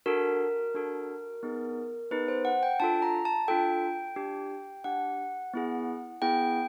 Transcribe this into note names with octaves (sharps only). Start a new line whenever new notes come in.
D4 F#4 A4 A#4
D4 F#4 A4
B3 D#4 G#4
B3 D#4 G#4 B4
C5
F#5
G5
D4 F4 A4 A5
A#5
A5
D4 F4 A4 G5
D4 G4
D4 G4 F#5
B3 E4 G#4
B3 E4 G#4 G5